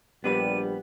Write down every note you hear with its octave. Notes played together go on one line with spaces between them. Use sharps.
A#1 G3 B3 D4 G4 B4 D#7